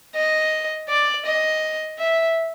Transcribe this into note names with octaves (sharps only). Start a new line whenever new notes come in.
D#5
D5
D#5
E5